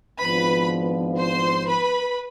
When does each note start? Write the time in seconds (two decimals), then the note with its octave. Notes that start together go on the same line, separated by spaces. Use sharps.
0.18 G#1 G#2 F3 B3 D4 B4 B5
1.19 C5 C6
1.69 B4 B5